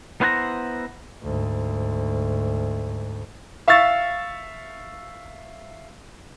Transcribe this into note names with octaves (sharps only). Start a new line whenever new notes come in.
B3 E4 C5 F#5 G#5 A#5
D2 G#2
E5 F5 C#6 E6 A6